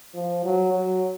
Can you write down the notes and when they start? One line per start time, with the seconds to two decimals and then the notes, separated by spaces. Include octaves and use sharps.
0.15 F3
0.44 F#3
0.73 F#3